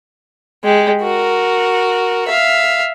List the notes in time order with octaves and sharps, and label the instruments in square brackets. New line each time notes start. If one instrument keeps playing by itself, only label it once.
[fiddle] G#3 G4
F#4 A#4
E5 F5